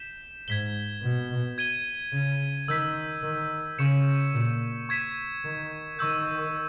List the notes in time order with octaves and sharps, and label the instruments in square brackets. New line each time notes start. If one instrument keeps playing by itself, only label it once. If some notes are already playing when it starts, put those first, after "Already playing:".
Already playing: [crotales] G6 B6 E7 G7
[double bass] G#2 [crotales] G#6 B6 G7
[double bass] B2
[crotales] G#6 D#7 G7
[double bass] C#3
[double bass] D#3 [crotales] E6 G6 B6
[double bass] D#3
[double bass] C#3 [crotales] C#6 G6 C#7 E7
[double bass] A#2
[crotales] C#6 G#6 B6 E7
[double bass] D#3
[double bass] D#3 [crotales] C#6 E6 G6